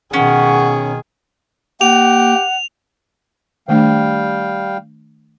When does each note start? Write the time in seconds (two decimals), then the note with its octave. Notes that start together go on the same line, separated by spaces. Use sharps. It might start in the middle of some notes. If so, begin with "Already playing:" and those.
0.13 B2 D#3 C#4 G#4 F#5
1.81 A#3 G4 F#5 F7
3.68 D#3 G3 A3 D4 F5 G5